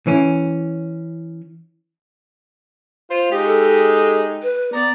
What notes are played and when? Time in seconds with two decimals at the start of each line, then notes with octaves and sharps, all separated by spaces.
0.07 E3 C#4
3.10 F4 C5
3.32 G#3 D#4 G4
3.45 A4
4.42 B4
4.73 B3 D5 A#5